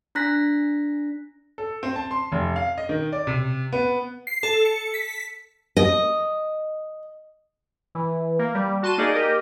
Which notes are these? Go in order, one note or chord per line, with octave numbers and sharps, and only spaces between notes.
D4 A#5 F#6 A#6 B6
A4
C4
A5
C6
F1
F5
D#5
D#3
D5
C3
B3
C7
A4
C#7
B6
D#5
E3
A#3
G3
F#4 A5 C6 D#7 E7
A#3 D#4 G#4 D5 D#5
G4 A#4 D#5